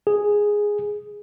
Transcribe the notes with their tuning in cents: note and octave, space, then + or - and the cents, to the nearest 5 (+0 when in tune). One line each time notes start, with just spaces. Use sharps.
G#4 -5